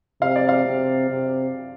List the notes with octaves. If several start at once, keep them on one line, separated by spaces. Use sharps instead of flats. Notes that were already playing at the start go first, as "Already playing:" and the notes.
C3 F5
D5
F5
C3
C3